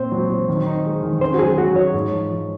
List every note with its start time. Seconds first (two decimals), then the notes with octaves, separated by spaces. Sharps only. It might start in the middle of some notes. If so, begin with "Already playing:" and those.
Already playing: A#2 C4 C5
0.12 F#3
0.30 F#3
0.48 D#3
0.67 D#4
0.84 G#3
1.03 D#3
1.21 C#4 C5
1.34 F#4
1.39 F#3 G#4
1.57 F#3 F#4
1.75 G#4 C#5
1.94 G#2
2.12 F3
2.31 F3